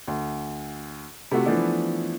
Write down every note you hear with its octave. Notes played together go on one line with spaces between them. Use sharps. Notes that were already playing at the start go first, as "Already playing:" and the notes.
D2
C3 A3 F4 F#4
E3 F3 A3 B3 D4